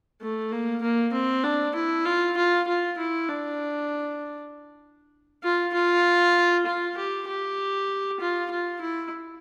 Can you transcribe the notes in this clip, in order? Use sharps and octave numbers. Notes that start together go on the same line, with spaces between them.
A3
A#3
A#3
C4
D4
E4
F4
F4
F4
E4
D4
F4
F4
F4
G4
G4
F4
F4
E4